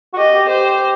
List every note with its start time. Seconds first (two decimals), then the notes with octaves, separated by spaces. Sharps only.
0.13 F#4
0.17 G4 D#5
0.34 G4
0.49 G4 C5